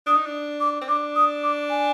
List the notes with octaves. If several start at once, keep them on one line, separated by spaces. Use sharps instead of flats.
D4 D#6
D#4
D4
D6
C4
D4 D6
D#6
D6
G#5